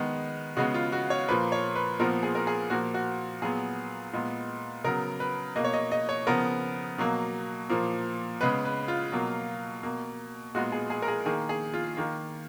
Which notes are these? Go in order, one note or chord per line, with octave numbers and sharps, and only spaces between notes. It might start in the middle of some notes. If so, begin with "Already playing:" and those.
Already playing: D#3 G#3 B3
C#3 G#3 B3 F#4
F4
F#4
C#5
A#2 F3 A#3 B4
C#5
B4
A#2 F3 B3 A#4
G#4
A#4
G#4
A#2 F3 A#3 F#4
F#4
A#2 F#3 B3 G#4
A#2 G#3 B3
C#3 F#3 B3 A#4
B4
B2 A#3 D#5
C#5
D#5
D#5
C#5
C#3 F3 B3 A#4
B2 F#3 A#3
A#2 F3 A#3
C#3 G#3 B3 B4
B4
F4
B2 F#3 A#3
B2 A#3
A#2 G#3 B3 F#4
G#4
G#4
A#4
G#4
D#3 A#3 G#4
G#4
F4
D#3 A#3